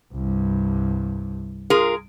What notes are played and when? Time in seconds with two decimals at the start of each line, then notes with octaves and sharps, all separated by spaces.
0.14 C2 G2
1.70 F4 G#4 A#4